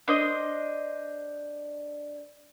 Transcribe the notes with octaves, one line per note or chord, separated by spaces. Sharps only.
D4 C5 D#5